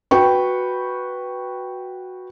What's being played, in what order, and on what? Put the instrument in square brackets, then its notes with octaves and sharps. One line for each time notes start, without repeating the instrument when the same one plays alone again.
[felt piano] F#4 B4 G5 C#6